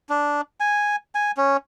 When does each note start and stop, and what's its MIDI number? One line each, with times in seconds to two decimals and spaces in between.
0.09 0.41 62
0.60 0.96 80
1.15 1.32 80
1.37 1.57 61